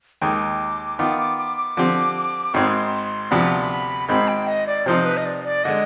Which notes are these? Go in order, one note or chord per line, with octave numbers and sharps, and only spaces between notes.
D#2 D#3 G#3 D6
D#3 B3 F4 D6
D6
D6
D6
D3 F3 C4 G4
G#1 G#2 D#3 G#3 C4 C6
D2 C3 F3 B3 D4 B5
C6
C6
B5
G#1 G#2 D#3 G#3 C4 B5
G5
D#5
D5
C3 F3 C4 D#4 C5
B4
D#5
D5
D5
D3 G#3 D#5